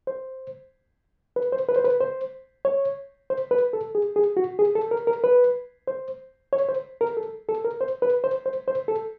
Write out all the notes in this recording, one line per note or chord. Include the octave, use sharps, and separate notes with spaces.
C5
B4
C5
B4
C5
B4
C5
C#5
C5
B4
A4
G#4
G#4
F#4
G#4
A4
A#4
A#4
B4
C5
C#5
C5
A#4
A4
A4
A#4
C5
B4
C5
C5
C5
A4